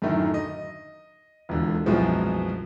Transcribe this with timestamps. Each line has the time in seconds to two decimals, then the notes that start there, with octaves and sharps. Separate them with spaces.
0.02 F#2 A2 D3 D#3 A3
0.34 D#5
1.49 E1 C#2 D3
1.86 C2 F#2 B2 F3 G#3